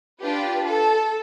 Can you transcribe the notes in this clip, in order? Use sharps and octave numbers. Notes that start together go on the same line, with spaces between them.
D4 F4 G4 B4
A4